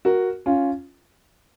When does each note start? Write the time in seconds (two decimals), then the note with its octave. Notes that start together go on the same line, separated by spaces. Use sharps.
0.05 F#4 A#4
0.46 C#4 F4